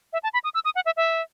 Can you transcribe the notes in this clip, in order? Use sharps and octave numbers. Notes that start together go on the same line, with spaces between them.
E5
A5
B5
D#6
E6
D#6
F#5
E5
E5